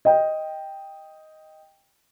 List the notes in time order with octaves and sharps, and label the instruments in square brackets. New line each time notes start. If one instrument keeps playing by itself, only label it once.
[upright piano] D#5 G5